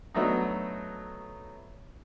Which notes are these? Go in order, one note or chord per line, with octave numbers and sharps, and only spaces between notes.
F#3 A3 B3 D4 D#4